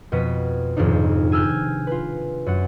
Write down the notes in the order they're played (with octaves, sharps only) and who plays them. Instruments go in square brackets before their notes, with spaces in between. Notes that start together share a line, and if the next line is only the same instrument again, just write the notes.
[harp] F2 B2 B3 D#5 B6
D#1 F2 G#2 C3 D4 D#4
G#5 E6 F6 G6 G#6
F4 B4
F#2 F#5